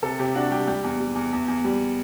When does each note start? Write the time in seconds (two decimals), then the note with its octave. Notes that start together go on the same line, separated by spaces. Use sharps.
0.02 C3 A4
0.19 C3 G4
0.35 D4 F#4
0.51 G3 G4
0.67 G3 G4
0.84 E2
1.00 G3
1.15 E2
1.33 E2
1.48 E2
1.64 G3